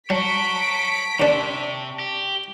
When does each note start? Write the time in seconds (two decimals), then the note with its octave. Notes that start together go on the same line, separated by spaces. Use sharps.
0.10 F#3 C#5 F#5 A5 C#6 B6 D7
1.20 D#2 C3 D4
1.99 G4